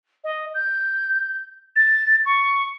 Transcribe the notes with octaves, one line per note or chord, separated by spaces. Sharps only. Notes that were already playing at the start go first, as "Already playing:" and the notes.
D#5
G6
A6
C#6